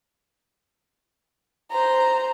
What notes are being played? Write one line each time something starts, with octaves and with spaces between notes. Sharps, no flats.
C5 A#5